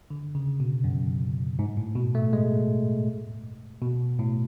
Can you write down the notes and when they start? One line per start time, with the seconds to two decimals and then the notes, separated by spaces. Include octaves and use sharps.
0.10 D3
0.35 C#3
0.60 B2
0.84 F#2
1.59 G#2
1.77 A2
1.95 B2
2.15 A3
2.33 G#3
3.82 B2
4.19 A2